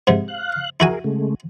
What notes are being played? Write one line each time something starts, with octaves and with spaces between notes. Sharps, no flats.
G#2 C3
F5 F#6
E4 F#4 G#4 A#4 G#5
C#3 G#3 A3